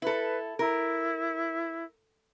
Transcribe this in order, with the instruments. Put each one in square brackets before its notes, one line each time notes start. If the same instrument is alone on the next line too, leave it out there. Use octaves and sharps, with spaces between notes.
[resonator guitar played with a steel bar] E4 A4 [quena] B4
[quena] E4 [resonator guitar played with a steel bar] A#4